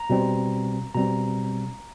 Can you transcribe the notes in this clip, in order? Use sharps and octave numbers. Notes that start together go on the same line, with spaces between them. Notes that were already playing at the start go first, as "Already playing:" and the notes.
Already playing: A#5
B2 G3 C4
B2 G3 C4 A#5